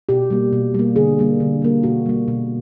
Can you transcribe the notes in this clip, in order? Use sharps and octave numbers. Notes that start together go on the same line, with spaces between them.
B2 G4
G3 A#3
B2
G3 A#3
D3 G#4
G3 A#3
D3
G3 A#3
B2 F#4
G3 A#3
B2